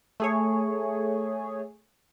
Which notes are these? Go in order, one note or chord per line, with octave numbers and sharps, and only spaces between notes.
A3 G#4 C#5